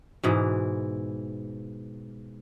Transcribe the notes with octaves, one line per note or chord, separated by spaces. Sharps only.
G#2 B2 E3